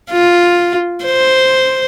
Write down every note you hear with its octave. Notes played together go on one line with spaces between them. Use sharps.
F4
C5